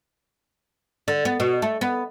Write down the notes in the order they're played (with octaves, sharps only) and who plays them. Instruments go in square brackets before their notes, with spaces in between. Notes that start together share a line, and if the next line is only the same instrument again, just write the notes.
[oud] D3
B3
B2
A3
B3